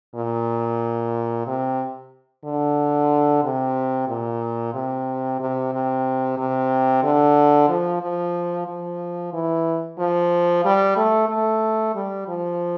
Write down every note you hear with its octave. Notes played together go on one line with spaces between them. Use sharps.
A#2
C3
D3
C3
A#2
C3
C3
C3
C3
D3
F3
F3
F3
E3
F3
G3
A3
A3
G3
F3